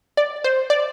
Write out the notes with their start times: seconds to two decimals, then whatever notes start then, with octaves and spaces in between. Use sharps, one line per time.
0.17 D5
0.44 C5
0.70 D5